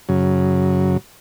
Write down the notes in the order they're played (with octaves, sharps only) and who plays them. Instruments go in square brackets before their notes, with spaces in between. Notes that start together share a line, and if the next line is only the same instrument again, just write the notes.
[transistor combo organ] F#2 C#3 F#3